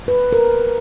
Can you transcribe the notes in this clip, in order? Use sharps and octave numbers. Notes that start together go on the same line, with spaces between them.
B4
A#4